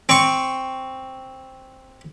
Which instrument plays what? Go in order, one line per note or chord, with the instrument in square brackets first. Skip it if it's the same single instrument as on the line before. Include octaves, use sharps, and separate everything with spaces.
[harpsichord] C4 C#6